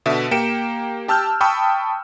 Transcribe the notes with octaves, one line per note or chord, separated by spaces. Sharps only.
B2 D3 E5 B6
A#3 G4 G5 C#7 D7 E7
G4 A5 E6 F6 G6
G5 A5 B5 C#6 D#6 E6